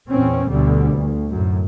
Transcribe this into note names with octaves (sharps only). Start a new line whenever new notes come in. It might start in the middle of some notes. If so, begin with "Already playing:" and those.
E2 A#2 C4 C#4
D2 B2 D3 G3
D2
F#2 A2